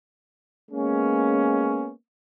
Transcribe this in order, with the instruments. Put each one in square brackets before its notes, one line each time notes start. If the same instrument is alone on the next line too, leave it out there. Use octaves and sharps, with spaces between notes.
[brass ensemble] G#3 A#3 B3 C#4